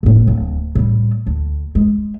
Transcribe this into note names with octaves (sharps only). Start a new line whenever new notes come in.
F#1 A2
D1
A2 G3
D2
G#3